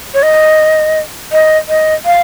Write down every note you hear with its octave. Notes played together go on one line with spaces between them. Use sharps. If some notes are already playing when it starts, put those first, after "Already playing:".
C#5
D#5
D#5
D#5
F5